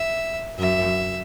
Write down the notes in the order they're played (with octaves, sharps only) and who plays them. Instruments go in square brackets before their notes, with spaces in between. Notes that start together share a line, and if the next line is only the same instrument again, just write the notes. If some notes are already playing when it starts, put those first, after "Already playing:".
Already playing: [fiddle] E5
[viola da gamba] F#2 [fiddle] E5